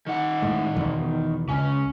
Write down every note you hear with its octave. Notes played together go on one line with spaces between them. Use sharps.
D#3 F#5
A2 G#3
E2 B2
C#2 C#4